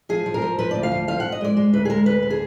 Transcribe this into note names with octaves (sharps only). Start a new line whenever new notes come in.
F3 G#4
F3
A#4
F3
F3 B4
D2 D5
F5
F3
F3 F5
F3 F#5
D#5
G#3 D5
G#3
D2 B4
G#4
G#3 A#4
D2 B4
D3
G#4